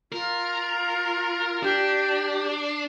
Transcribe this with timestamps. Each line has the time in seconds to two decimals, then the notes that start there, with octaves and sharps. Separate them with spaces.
0.12 F4 A#4
1.63 D4 G4